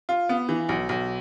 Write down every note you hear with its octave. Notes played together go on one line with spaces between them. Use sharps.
F4
B3
E3
B1
B1